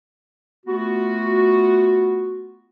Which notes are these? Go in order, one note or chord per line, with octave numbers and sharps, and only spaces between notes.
A3 B3 F4 F#4